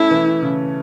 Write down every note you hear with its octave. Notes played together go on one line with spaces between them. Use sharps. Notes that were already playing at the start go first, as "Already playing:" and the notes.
Already playing: A3 C#4 E4
E3
C#3